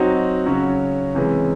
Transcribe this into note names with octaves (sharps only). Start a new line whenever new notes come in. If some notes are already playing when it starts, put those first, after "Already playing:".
Already playing: F#3 C4 D#4 F#4
C#3 F#3 C#4 F#4
C3 E3 G#3 C#4